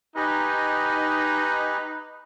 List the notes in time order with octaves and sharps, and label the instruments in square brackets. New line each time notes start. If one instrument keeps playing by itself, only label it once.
[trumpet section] D#4 [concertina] G4 D#5 G#5 [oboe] B4